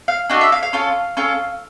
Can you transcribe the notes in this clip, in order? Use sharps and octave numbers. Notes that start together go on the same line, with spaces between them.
F5
D4 F#4 A4 D#5
E5
F5
F5
C#4 F4 A4
C#4 F4 A4